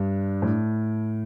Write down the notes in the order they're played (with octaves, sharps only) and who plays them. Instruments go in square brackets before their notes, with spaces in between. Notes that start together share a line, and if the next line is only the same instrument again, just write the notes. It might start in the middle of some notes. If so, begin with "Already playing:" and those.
Already playing: [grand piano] G2
A2